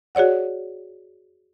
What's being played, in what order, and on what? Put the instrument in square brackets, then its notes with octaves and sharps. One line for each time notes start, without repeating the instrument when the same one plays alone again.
[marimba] F#4 G#4 C#5 D5 F#5